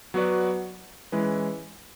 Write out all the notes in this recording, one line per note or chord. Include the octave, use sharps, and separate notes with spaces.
F#3 B3 F#4 B4 D5
E3 G#3 C#4 E4 B4